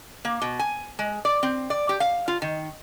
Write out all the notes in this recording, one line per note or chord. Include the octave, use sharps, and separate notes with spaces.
A#3
B2
G#5
G#3
D5
C4
D5
G4
F5
F4
D#3